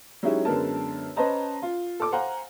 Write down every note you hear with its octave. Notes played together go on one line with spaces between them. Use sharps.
F#3 G#3 C#4 D#4 E4 G4
F#2 D3 G#3 B3 A#4 A5
C#4 B4 C5 D#5 A5 A#5
F4
A4 D6
C5 F5 F#5 G#5 A#5